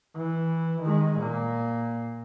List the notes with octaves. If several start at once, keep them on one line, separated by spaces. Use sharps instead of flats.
E3
D#3 G#3
A#2 A#3